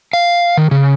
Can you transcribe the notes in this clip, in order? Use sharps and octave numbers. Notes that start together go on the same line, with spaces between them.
F5
D#3
C#3